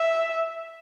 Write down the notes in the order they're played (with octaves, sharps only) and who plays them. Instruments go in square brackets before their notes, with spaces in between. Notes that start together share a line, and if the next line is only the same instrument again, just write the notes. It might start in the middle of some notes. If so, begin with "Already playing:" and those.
Already playing: [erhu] E5